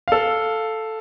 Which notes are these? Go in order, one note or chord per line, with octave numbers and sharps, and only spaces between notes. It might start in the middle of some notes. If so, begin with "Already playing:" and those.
A4 F5